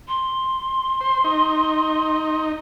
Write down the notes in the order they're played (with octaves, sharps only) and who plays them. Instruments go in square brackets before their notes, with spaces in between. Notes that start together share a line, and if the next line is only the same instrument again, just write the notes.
[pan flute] C6
[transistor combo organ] C5
D#4